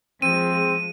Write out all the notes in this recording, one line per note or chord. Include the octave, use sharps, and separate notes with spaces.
F3 G#3 C4 D#7